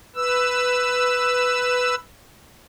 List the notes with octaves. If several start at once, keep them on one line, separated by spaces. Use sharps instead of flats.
B4 E6